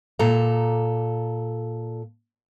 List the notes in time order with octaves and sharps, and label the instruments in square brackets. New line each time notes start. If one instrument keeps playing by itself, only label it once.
[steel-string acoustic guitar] A#2 A4 A#5